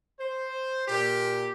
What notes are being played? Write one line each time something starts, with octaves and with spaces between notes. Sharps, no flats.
C5
A#2 G4